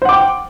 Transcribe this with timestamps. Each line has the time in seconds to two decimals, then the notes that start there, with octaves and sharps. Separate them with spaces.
0.02 C5
0.05 F#5
0.09 D6
0.12 G5